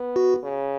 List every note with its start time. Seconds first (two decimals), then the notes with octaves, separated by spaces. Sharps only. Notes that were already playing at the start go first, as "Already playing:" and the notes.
Already playing: B3
0.16 F#4
0.43 C#3